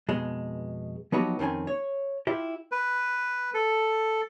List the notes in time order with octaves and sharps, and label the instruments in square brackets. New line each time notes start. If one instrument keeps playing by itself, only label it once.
[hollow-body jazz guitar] F2 B2 G#3
F3 F#3 B3 D#4 F#4 G4
F2 D#3 C4 C#4 G#5
C#5
E4 F4 G4
[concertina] B4
A4